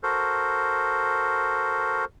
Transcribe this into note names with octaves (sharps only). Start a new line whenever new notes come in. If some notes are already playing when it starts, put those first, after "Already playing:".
F#4 A4 A#4 C5